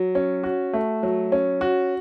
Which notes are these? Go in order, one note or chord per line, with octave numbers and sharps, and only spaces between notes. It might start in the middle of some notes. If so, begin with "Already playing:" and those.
Already playing: F#3
C#4
F#4
A3
F#3
C#4
F#4